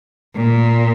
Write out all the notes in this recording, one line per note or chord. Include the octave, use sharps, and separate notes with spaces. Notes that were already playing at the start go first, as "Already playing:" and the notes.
A#2